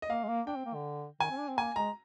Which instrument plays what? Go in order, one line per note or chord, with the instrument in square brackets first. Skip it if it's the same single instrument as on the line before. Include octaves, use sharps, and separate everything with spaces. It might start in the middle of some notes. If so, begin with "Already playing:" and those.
[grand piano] D#5
[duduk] A#3 [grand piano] F5
[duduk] G#3
A#3
[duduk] D4 [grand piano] G5
[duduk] C4
A#3
D3
[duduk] D#3 [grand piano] G#5
[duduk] C4
D4
C4
[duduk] A#3 [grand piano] G#5
[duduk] G#3 [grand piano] A#5